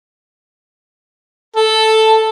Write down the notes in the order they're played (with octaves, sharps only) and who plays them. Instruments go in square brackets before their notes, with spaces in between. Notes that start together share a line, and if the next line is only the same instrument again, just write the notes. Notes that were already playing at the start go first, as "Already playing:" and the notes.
[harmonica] A4